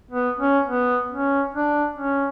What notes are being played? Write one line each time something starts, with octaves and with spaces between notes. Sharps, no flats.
B3
C#4
B3
C#4
D4
C#4